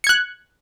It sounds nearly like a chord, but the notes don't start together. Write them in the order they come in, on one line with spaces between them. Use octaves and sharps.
C#7 G#6 F#6